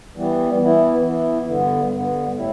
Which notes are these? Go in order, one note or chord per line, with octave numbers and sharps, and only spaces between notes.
E3 G3 B3
E3 B3 E4
E3 B3 E4
G2 D3 B3
G2 D3 B3
A2 G3 E4